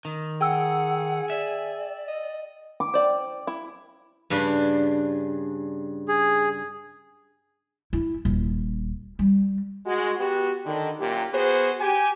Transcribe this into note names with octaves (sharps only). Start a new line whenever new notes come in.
D#3
G#4 F#5 G5 E6
D5 E5
D#5
D6
C5 D5 G5
E4
G2 C#3 D4
G#4
E4
D#1
G3
G#3 F#4
B3 F#4 G4
D3 D#3
F#2 A#2 G4
B3 F#4 G#4 C5
G4 G#5